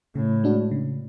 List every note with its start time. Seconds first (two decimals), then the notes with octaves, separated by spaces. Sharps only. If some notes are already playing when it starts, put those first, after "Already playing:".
0.15 A2 C#3
0.44 G#3 D4 F#4
0.71 C#3